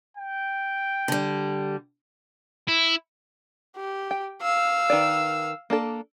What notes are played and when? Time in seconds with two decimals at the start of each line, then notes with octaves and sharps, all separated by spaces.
0.17 G5
1.08 D3 G3
2.68 E4
3.77 G4
4.11 G5
4.42 F5 E6
4.90 D#3 B4 D5
5.70 A#3 D4 A4